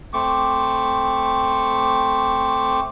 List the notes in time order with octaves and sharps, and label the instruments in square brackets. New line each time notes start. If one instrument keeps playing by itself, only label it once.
[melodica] A3 C4 C#6 D6